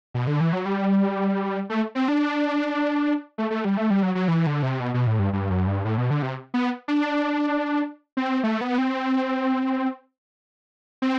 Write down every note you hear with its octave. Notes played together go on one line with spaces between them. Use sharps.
B2
D3
E3
F#3
G3
A3
C4
D4
A3
A3
G3
A3
G3
F#3
F#3
E3
D3
C3
B2
B2
A2
G2
G2
F#2
G2
A2
B2
D3
C3
B3
D4
C4
A3
B3
C4
C4